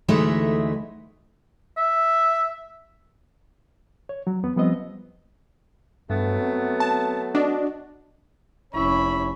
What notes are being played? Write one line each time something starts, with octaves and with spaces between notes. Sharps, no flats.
D2 E3 G#3 A3 D#4 E5
E5
C#5
F#3
E2 B3
F3 G3 B3 C4 D#5
G2 F#3 A3 B3
C4
A5
D4 F#4 D#5
F1 C#4 E4 B5 C#6